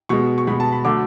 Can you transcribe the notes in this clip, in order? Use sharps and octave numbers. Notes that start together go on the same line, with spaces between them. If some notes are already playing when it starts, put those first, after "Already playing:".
B2 G#3 C#6
C#6
B2 G#3 B5
A5
B5
D3 F#3 A3 D6